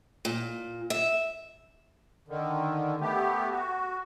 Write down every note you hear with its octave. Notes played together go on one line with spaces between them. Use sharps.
A#2
E5
D3 D#3
A3 B3 G4
F#4